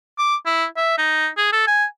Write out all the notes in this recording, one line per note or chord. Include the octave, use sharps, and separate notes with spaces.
D6
E4
E5
D#4
G#4
A4
G#5